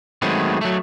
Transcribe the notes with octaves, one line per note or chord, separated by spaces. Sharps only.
D#3 F#3 G#3 A3 B3 C4
F#3 A3